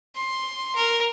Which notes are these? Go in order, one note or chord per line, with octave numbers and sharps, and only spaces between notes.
C6
A#4